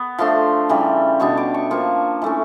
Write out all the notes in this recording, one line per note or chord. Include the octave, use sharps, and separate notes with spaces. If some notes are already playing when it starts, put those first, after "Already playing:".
Already playing: B3
F3 A3 D4 C6
C#3 E3 G3
B2 G3 B3 D4 C#6
D6
C#6
F3 A#3 D4 C#6
E3 A3 C#4